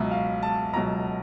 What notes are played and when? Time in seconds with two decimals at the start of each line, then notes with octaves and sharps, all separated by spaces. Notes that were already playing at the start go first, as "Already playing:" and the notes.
Already playing: C#2 B2 F#3 E5
0.11 F5
0.43 A5
0.73 C#2 B2 F#3 A#5